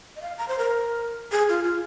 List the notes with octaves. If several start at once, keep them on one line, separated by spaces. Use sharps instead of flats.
D#5
F5
A#5
C5
A#4
G#4
F4
F4